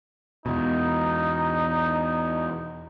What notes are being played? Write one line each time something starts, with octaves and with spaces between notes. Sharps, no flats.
E2 B2 D#4